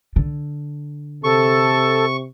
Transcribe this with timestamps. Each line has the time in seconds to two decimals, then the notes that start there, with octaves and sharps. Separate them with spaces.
0.16 D3
1.24 C3 A4 C#6